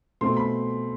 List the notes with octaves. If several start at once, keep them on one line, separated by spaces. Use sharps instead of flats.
B2 A3 C4 C6
B5